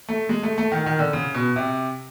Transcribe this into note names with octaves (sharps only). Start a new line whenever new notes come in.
A3
G#3
A3
A3
D#3
D#3
D3
C#3
B2
C3